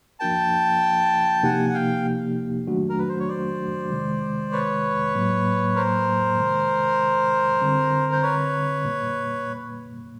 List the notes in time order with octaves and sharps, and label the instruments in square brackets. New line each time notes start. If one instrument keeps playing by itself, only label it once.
[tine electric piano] F3 A#3 D4 F#4 A#4 [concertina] G5 A5
[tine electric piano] C3 F3 A#3 D#4 G4 [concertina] F#5 G#5
[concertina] F#5
F5 G5
[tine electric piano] D#3 F#3 A3 D4 F#4
[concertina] A#4
B4
C5
C#5
C5 D5
[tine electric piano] C3 D#3 G#3
[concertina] B4 C#5
[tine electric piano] A2 F#3 A#3
[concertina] A#4 C5
[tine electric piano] C3 D#3 G#3
D3 G3 C4
[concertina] C5
B4 C#5
[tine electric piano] A#2 G3 A#3